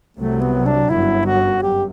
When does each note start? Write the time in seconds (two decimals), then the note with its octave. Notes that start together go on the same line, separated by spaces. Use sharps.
0.17 C2 C3 F#3 A3
0.41 B3
0.66 D4
0.89 G1 F#2 F#3 E4
1.26 F#4
1.62 F#2 G4